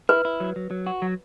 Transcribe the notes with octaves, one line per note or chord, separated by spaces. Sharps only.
E4 B4
E4
F#3
F#3
F#3
F#4
F#3